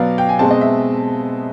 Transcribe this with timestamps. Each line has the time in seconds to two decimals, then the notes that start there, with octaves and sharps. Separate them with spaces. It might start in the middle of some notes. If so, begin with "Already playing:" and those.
Already playing: B2 F#3 B3 D5 F5
0.18 G5
0.29 G#5
0.39 B2 G#3 C4 A5
0.51 D#5
0.61 E5